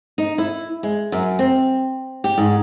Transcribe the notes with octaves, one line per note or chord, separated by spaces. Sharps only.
D#4
E4
G#3
F#2
C4
G4
G#2